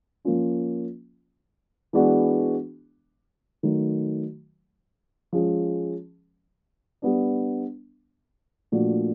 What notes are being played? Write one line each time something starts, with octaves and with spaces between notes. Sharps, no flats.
F3 A#3 C#4 F4
E3 G#3 B3 D4 F#4
D#3 F#3 A3
F3 G#3 C#4
G3 B3 D4
A#2 F3 A3 D4 F#4